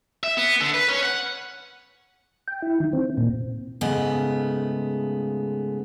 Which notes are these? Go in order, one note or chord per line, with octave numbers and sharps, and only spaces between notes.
E5
B3
D3
B4
C#4
F#5
G5
E4
D#3
C4
A#2
G#2 C#3 A3 B3